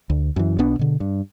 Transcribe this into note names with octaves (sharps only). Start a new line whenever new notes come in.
D2
F#2 E3
B1 B2 B3 D4
B2 D3
G2